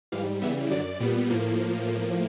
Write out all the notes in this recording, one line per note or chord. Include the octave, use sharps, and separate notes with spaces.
G#2 E3 G3 F5
C#3 E3 G3 B3 E5
F#2 D3 F#3 D5
A#2 G3 B3
A2 F3 A#3